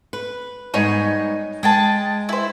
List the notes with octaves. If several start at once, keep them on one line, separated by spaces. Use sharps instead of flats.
B4
G#2 G3 B3 C#5 D#5 G#5
G#3 G#4 G5 A5
E4 C5